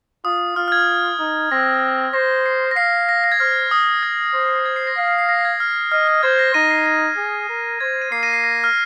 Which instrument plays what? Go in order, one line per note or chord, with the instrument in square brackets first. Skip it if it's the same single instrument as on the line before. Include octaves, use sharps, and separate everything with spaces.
[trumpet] F4 [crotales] D#6
[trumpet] F4 [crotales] F6
[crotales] F6
G#6
[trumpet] D#4
[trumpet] C4 [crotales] A#6
[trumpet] C5 [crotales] A#6
[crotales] C7
A#6
[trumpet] F5 [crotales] C7
[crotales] A#6
A#6
G#6
[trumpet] C5 [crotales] F6
[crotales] D#6
G#6
[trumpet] C5
[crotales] G#6
C7
A#6
[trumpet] F5 [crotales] C7
[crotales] C7
C7
A#6
G#6
F6
[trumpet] D#5 [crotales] F6
[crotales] F6
[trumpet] C5 [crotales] G#6
[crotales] A#6
[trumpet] D#4 [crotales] A#6 D#7
[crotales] C7
A#6
[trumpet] G#4
A#4
[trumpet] C5 [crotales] G#6
[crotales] D#7
[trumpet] A#3 [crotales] C7
[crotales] A#6 D#7
C7
A#6
F6